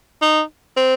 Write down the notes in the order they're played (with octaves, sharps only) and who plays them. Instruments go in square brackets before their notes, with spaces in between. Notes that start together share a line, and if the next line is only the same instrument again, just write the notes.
[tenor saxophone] D#4
C4